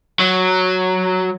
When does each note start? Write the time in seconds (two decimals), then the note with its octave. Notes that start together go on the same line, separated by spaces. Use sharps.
0.19 F#3